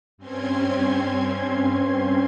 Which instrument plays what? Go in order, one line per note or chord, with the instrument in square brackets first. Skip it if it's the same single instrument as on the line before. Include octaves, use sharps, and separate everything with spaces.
[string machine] G2 C4 C#4 C6 G#6